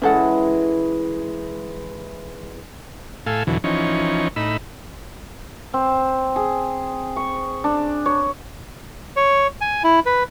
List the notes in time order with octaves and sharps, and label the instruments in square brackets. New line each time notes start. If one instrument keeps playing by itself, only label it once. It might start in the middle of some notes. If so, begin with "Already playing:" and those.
[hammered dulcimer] E3 G#3 [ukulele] C#4 A4 F#5
[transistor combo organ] A2 A4 F5 G#5 E6
E2 B2 D3 E3 F#3
E3 F3 C#4 D#4 C#6
A2 D#4 B5 E6
[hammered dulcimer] C4
G#4
C#6
D4
C#5
[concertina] C#5
G#5
E4
B4